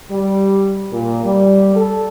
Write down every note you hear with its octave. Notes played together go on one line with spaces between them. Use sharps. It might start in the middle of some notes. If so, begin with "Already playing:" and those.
G3
A#2
G3
A4